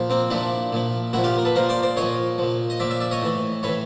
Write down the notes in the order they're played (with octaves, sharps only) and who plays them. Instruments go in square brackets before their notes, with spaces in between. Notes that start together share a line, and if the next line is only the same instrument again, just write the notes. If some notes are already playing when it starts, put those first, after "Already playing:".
Already playing: [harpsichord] A#2 F3
A#3 C4
A#2 F3 D4 E4
A#2 F3
A#2 F3 E4 F#4
F4 G4
A#4
A4 B4
A#2 F3 A#4 C5
C5 D5
C5 D5
A#2 F3 C#5 D#5
A#2 F3
D#5
A#2 F3 D5 E5
D5 E5
D5 E5
C#5 D#5
A2 E3
A2 E3 B4 C#5